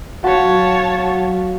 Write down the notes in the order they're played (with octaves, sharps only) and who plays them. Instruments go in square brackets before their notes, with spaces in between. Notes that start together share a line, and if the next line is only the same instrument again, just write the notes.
[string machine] F#3 [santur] F#4 [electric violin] C#5 A5 [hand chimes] F5